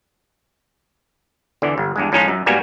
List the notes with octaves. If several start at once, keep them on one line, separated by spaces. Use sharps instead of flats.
E2 D3 E3
G1
E2 G2 G#3
A2 F3 G#3 C#4 D#4 F4
F#2
G#2 G3 A#3 B3 F#4 G#5